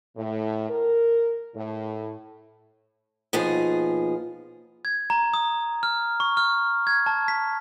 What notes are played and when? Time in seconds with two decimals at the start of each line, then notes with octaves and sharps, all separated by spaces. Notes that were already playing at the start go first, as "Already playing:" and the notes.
0.17 A2
0.69 A#4
1.55 A2
3.33 D#2 B2 F3 G#4
4.85 G#6
5.10 A#5
5.34 D#6
5.83 F6
6.20 C#6
6.37 F6
6.87 G#6
7.06 A5
7.28 B6